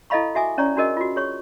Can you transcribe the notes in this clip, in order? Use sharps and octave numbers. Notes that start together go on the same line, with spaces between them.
E4 A4 D#5 F5 B5 C#6
F#4 E5 G#5 D6 D#6
C#4 C#5 D5 A#5 C#6
C#4 D4 F#4 G#4 A#4 D#5
F4 F#4
G#4 C#5 C#6